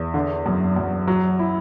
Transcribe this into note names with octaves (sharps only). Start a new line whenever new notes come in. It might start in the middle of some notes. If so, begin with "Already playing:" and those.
Already playing: E2
D3
F#2
F#2
F#3
E4